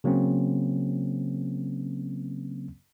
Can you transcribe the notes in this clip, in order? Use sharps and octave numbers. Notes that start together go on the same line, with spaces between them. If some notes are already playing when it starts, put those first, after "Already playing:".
C#3 F#3 A#3 C4 C#4